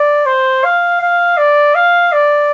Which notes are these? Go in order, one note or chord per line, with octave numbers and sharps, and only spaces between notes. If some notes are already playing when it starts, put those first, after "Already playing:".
Already playing: D5
C5
F5
F5
D5
F5
D5